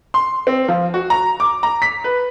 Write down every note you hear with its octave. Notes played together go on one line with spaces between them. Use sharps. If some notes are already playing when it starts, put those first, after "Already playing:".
C6
C4
F3
F#4
A#5
D6
A#5
B6
B4